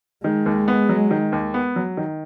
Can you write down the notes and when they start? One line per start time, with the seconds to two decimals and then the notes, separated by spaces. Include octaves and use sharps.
0.24 D#3 G#3
0.46 D#2
0.68 B3
0.89 F#3
1.11 D#3
1.32 D#2
1.54 B3
1.76 F#3
1.97 D#3